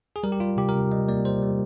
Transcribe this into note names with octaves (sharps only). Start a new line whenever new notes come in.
G#4
G3 A#4
G4
G3 F4
C3 G4
A#4
C3
G3 D#5
A#3 D5
G3 C5
G3